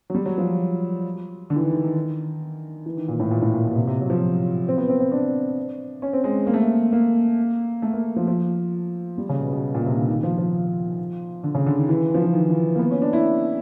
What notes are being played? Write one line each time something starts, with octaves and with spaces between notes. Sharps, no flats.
F#3
G3
F#3
F3
D3
E3
D#3
D#3
D#3
E3
D#3
A#2
A2
A#2
A2
A#2
B2
C3
C3
F#3
F3
C4
B3
C4
C4
D4
C#4
C4
G#3
A#3
A3
A#3
A#3
A3
A#3
F3
F3
G3
C#3
B2
B2
A#2
C3
D3
D#3
F3
F3
D3
C#3
D3
D#3
E3
F3
E3
D#3
E3
A#3
B3
C#4
D4
E4